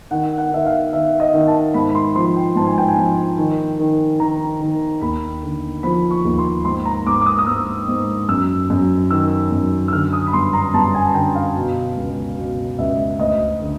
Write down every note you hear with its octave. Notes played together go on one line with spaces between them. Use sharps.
D#3 F#5
F#5
D#3 E5
F5
D#3 E5
D#5
D#3
A5
G#2 B5
B5
C6
F3 C6
G5
G#2 A5
G#5
G5
G#5
F3
D#3
D#3
D#3 A#5
D#3
D#2 B5
D3
F3 B5
C#6
D#2
C6
G#2 C6
A#5
G#2 D6
D6
D#6
D#6
G#2 E6
G#2
F#2 E6
F#2
D#3 E6
F#2
E6
D3 F6
D#6
B5
G2 C6
A#5
G2 A5
G#5
G#5
D3 G5
F5
B2
C#2
B2
C#2 E5
D2 D#5
D3